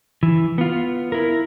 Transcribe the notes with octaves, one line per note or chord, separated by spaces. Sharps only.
E3
B3 F4
E4 A#4